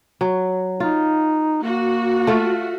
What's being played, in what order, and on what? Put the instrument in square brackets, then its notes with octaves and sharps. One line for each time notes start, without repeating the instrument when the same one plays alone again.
[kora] F#3
[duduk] D#4 [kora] F4
[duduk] A#3 [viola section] F#4
[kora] A3 F4